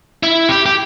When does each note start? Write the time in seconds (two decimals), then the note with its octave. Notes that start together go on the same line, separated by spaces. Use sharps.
0.23 E4
0.49 G4
0.66 G4